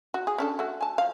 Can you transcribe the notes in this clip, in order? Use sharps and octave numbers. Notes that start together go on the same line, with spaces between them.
F#4
G#4
C#4 D4 A4
A3 F#4
G#5 A5
F3 F5